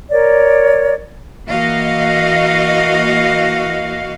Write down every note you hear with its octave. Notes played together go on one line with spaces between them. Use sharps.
A#4 C#5 D5
E3 A#3 F#4 D#5 F5